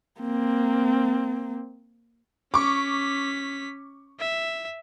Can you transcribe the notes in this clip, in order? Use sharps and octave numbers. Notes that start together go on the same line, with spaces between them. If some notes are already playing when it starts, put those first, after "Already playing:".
A#3 C4
C#4 C#6 D6 B6
E5